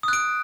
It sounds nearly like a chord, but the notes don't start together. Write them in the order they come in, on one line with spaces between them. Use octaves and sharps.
D#6 F#6 D7